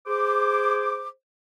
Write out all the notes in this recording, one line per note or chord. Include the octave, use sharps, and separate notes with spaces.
G#4 C5 D6